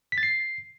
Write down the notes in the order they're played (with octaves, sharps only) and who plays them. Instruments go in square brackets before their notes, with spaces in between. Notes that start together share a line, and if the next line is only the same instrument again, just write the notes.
[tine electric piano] B6
A6
C7